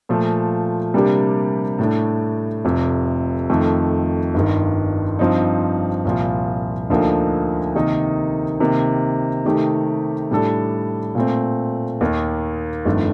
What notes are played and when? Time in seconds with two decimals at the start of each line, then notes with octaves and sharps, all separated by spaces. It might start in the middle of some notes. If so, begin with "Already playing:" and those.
0.09 A#2 F3 A3
0.94 C3 G3 A#3 D4 G4
1.79 A2 A3 D4
2.65 F1 F2 C3
3.50 F2 D#3 A3
4.34 G1 G2 D#3
5.19 G2 F3 C4 D#4
6.05 C2 A#2 F3
6.90 D2 D3 F3 A#3 D#4
7.75 C3 D#3 A#3 D#4
8.60 C3 D#3 A#3
9.46 C3 D#3 A3 D#4 G4
10.31 A2 G3 D4 A4
11.15 A#2 A3 C4
12.01 D#2 D#3 A#3 D#4
12.85 G1 F2 D#3 A3 D4